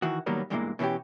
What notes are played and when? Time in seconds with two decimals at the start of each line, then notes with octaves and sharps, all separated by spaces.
0.02 D#3 E3 F#4
0.26 A2 D#3 F#3 G3 A#3 B3
0.50 E2 G2 A#2 E3 G#3 A#3
0.79 B2 E3 B3 C#4 G4